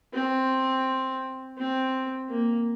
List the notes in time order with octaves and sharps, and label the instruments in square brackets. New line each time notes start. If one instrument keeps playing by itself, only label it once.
[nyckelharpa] C4
C4
A#3